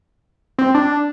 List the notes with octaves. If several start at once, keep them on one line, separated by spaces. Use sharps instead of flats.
C4
D4